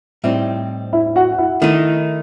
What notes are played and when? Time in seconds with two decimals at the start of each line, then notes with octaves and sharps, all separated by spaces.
0.24 A2 G3 C4 D#4 E4 E5
0.93 E4 E5
1.16 F#4 F#5
1.32 F#5
1.38 E4 E5
1.62 D#3 A3 D#4 E4 E5